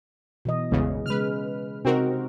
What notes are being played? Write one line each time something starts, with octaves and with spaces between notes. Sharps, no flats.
B2 E3 D#5
A1 E2 C#3 G#3
C#3 G#3 B4 F6
C3 C4 D#4 F#4 A#4